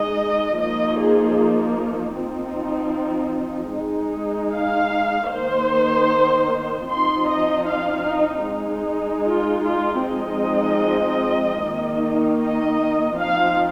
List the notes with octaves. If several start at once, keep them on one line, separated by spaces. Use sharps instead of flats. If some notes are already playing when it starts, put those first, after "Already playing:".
Already playing: G#3 D#4 D#5
F3 A#3 D#4 D#5
G#4
F3 C4 D#4
G#3 D#4
F5
D#3 A#3 D#4 C5
F3 C4 D#4 C6
D#5
F5
D#4
G#3 D#4
F4
F4
F3 G#3 C4 D#4 D#5
D#3 A#3 D#4
D#5
F3 C4 D#4 F5